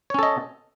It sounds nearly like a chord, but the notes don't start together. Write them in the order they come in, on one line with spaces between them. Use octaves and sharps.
C#5 C#4 A4 D#5